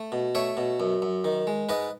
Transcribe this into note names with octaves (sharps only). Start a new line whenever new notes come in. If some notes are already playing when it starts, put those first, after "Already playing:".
Already playing: A3
B2
A3 C#5 E5
B2
F#2
F#2
D#3
G#3
G#2 B4 D#5